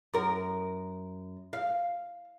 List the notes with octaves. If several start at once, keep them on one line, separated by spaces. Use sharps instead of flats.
F#2 A#4
F5